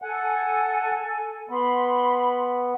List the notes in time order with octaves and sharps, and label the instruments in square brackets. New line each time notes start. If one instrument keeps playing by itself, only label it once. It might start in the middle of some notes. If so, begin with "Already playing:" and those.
[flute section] A4 G#5 [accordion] F#5
[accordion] B3 [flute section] B5 C6